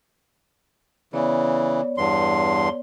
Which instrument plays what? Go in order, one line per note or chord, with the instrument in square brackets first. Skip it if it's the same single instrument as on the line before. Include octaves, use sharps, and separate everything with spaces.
[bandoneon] C#3 E3 [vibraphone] B3 C#5 D5
[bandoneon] E2 G2 C6